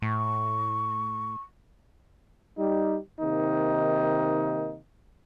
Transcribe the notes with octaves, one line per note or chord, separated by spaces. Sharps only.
A2 C#6
G3 D#4
C3 D#3 A#3 D#4